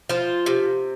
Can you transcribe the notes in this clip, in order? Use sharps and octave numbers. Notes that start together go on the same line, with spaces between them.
F3 F4
C3